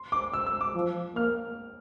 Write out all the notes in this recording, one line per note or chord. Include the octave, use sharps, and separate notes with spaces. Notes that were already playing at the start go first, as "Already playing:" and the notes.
Already playing: C6
D6
E6
E6
D6
F3
A#3 F6